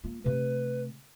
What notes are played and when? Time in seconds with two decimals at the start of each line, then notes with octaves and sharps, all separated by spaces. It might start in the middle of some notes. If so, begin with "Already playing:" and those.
0.04 A#3 F4
0.24 C3 A3 B4